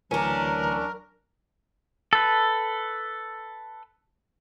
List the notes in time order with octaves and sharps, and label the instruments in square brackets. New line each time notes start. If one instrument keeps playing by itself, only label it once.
[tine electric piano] D2 E3 [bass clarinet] F#3 [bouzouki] C#4 D4 [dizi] A#4
[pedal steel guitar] A4 B4